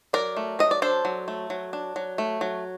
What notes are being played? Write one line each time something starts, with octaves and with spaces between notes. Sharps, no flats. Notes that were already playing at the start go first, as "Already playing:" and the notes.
F#3 A#4 D5
A3
F#3 D#5
D5
D4 A4 C5
F#3
A3
F#3
D4
F#3
A3
F#3